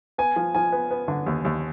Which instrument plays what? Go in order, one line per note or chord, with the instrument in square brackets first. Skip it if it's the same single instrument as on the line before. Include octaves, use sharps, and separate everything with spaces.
[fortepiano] B3 [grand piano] G#5
[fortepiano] F3
[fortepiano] F3 [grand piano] G#5
[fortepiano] B3
B3
D3
D#2
D#2